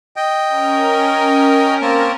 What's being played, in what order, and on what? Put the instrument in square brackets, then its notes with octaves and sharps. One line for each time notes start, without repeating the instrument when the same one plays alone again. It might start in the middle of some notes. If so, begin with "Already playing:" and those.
[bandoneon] D#5 G5
[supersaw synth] C#4 A#4
[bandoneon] A#3 C4 A5